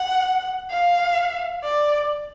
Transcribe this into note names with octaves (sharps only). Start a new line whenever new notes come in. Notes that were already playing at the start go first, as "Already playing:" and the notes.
Already playing: F#5
F5
D5